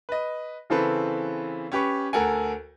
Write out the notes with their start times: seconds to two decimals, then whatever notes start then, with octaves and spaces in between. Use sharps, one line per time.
0.09 B4 D#5
0.70 C#3 E3 C4 A4 B4
1.72 C#4 G4 B4 C#6
2.13 D2 A4 A#4 F#5 G#5